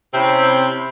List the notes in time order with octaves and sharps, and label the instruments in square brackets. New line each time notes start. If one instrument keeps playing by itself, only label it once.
[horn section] C3 C4 C#4 E4 B5